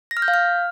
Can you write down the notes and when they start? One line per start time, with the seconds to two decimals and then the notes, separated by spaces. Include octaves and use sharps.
0.11 A#6
0.17 F6
0.22 G6
0.28 F5
0.34 F6